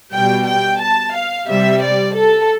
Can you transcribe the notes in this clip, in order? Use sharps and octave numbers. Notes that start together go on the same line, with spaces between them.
B2 G3 G5
G5
A5
F5
C3 G3 E5
D5
A4